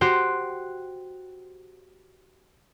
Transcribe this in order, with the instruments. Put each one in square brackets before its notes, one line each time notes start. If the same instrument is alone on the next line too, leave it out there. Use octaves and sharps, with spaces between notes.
[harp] F#4 G4 C5